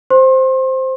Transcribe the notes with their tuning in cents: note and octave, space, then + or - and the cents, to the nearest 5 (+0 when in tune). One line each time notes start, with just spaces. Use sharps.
C5 +0 C6 +35